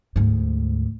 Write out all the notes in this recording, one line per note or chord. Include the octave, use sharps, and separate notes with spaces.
D2 G#2